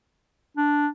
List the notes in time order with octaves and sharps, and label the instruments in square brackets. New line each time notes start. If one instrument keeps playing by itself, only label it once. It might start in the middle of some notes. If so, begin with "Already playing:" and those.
[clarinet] D4